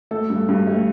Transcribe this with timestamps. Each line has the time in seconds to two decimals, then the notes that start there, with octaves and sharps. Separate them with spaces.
0.11 A3 A4
0.30 G2
0.49 G2
0.67 A3